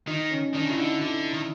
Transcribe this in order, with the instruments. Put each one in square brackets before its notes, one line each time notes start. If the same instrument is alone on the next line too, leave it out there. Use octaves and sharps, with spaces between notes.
[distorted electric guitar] D#3 [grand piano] D#4
[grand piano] C#4
C#4
[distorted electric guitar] D#3 [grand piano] D4
[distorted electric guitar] C#3 [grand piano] E4
[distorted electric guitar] D3 [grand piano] D#4
[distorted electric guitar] D3 [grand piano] E4
[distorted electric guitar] D#3